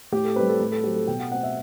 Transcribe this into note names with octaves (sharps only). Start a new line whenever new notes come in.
A2 G4
A4
G3 C4 B4
A4
A2 B4
A4
F#3 C4 G4
A4
B2 G5
F#5
A3 C4 F#5
E5